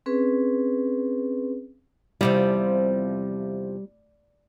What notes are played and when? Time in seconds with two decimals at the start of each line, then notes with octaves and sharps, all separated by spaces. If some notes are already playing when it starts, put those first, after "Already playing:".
0.06 C4 C#4 G#4 B4
2.21 E2 C3 F3 G3